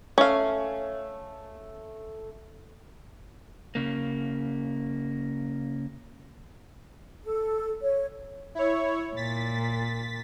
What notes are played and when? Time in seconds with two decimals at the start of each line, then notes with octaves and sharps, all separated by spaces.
0.18 A3 C#4 F5
3.75 C#3 A#3
7.24 A4
7.82 C#5
8.55 E4 C#5
9.16 A#2 A6 B6